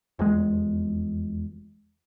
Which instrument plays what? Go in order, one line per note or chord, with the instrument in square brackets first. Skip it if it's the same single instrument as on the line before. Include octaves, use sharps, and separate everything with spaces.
[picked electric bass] F1 E2 G#3